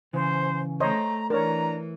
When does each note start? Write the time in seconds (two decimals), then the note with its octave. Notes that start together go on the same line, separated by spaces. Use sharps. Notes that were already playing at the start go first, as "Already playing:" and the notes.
0.13 C#3 E3 C5
0.80 A3 C5 C#5 D#5 A#5
1.30 E3 D4 A#4 C#5 A#5